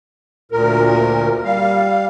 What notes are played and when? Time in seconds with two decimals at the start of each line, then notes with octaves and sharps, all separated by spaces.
0.52 D2 A#2 A#4
1.45 G3 F5